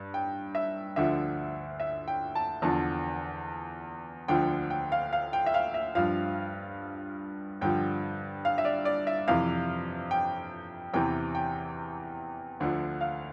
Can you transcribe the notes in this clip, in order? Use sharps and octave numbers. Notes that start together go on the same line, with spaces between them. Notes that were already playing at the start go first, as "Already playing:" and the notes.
Already playing: G2
G5
E5
D2 D3 F3 E5
E5
G5
A5
E2 D3 F3 A5
D2 D3 F3 G5
G5
F5
F5
G5
E5
F5
E5
G2 F3 F5
G2 D3 F3 G5
F5
E5
D5
D5
E5
F2 C3 E3 F5
G5
E2 C3 E3 G5
G5
D2 D3 F3
F5